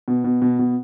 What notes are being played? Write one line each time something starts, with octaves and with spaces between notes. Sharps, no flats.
B2
B2
B2
B2